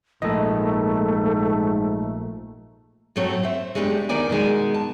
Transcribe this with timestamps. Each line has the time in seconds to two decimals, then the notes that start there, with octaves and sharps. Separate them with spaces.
0.22 A#1 G#2 A3 A4 D#5
3.16 A2 F#3 A3 C4 C#5
3.43 C5 E5
3.75 G#3 A3 B3 D4 F#4 G4
4.09 D2 D#3 B3 A#4 D5 G#5
4.30 B2 D#3 G#3 G#5
4.74 A5